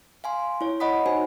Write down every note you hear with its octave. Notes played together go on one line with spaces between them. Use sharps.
F5 G#5 C6
E4 C#5
C#5 D#5 F#5 B5 D#6 B6
D#4 F#4 C5 G#5